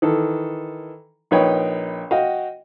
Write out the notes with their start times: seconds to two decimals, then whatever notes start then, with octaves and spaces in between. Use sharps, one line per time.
0.02 D#3 E3 A4
1.31 A#1 D#4 B4 C#5 G5
2.11 F#4 D#5 F5 G5